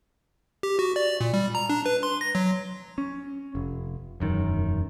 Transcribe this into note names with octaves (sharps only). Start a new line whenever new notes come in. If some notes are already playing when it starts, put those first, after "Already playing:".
G4
F#4
D5
A#2
G3
A#5
D4
B4
C6
A#6
F#3
C#4
F1
E1 F#2 D#3